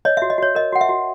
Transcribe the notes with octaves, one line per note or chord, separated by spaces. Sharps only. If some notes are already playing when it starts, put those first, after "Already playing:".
C#5 D#5
E5
F#4
D#5
F#4 C#5
A#4 D#5
F#4 F#5
E5
F#4